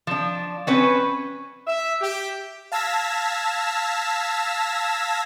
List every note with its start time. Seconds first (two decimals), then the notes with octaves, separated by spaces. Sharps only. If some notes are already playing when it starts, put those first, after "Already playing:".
0.07 F3 D4
0.67 C4 C#4 B4
1.66 E5
2.01 G4
2.72 F5 A5 E6 G#6 A#6 B6